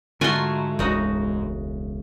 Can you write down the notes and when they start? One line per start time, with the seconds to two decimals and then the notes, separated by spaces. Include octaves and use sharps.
0.21 G#2 D3 A3 F4 F#4 G#5 C6
0.79 E1 C#2 C#3 D#4 F#4